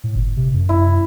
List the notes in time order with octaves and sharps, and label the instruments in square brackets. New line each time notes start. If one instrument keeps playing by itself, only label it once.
[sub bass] A2
G1
C3
F#2
[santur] E4